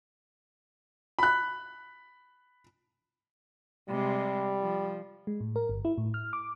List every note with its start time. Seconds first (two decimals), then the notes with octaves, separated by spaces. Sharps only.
1.19 B5 F#6
3.89 C3 G3 G#3
4.61 F3
5.27 G#3
5.40 A2
5.56 A#4
5.69 G1
5.85 E4
5.98 A2
6.14 F6
6.33 D6